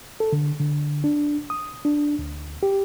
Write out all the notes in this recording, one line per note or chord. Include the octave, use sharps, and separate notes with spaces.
A4
D3
D3
D4
D#6
D4
D2
G4